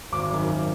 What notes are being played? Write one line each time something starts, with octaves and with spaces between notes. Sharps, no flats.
G#1 D6
F#2 D#3
G#1